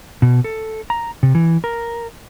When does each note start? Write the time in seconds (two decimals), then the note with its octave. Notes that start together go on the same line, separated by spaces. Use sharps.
0.22 B2
0.44 A4
0.90 A#5
1.23 C3
1.35 E3
1.64 A#4